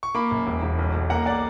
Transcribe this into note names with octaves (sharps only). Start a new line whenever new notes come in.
C#6
A#3 B5 D6
F#1
E1
E1
B1
B1
A#3 F#5 A#5
D5 F#5